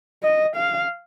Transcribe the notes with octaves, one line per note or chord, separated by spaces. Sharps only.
D#5
F5